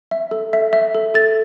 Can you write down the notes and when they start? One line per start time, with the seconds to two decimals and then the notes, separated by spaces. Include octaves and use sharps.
0.11 E5
0.31 A4
0.53 E5
0.73 E5
0.95 A4
1.14 A4 A6